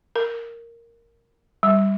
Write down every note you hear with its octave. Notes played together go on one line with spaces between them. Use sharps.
A#4
G3